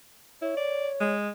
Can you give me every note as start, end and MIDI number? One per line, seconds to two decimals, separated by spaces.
0.42 0.55 64
0.42 1.14 73
0.57 0.89 74
1.01 1.29 56